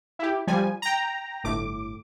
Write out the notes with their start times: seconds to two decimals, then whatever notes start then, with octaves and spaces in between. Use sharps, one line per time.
0.19 E4 G4
0.47 F3 G3 G#5
0.82 G5 A#5
1.44 G1 A2 D6